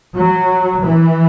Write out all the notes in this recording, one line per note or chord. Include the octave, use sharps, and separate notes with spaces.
F#3
E3